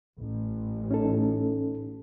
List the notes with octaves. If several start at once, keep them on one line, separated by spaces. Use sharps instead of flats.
A1
C#4 D#4 A4